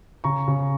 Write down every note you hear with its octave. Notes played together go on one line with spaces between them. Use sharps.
C#3 A#5 C#6
C#3